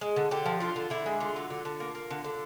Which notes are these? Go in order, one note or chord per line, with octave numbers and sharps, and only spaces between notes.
G#3
D3
D3 G4
F3
D3 F4
D3
D3 E4
G#3
D3 F4
F#3
D3
D3
A#3
A#3
D3
D3